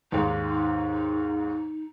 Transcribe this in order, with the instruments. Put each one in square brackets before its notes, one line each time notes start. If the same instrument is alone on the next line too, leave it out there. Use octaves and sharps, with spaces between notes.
[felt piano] D#2 G#2 [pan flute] D#4